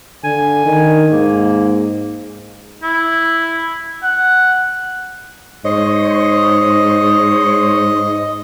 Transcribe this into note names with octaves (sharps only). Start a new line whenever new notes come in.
D3 G#5
D#3
G#2 A#3
E4
F#5
G#2 C5 C#5 D#5